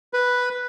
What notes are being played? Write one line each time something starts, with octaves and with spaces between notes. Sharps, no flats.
B4